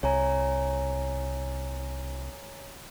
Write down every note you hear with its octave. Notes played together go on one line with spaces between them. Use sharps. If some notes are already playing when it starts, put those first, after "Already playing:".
C2 C#5 G#5 A#5